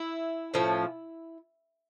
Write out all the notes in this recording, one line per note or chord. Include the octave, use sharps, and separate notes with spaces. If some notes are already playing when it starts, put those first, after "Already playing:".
Already playing: E4
A2 F3 C#4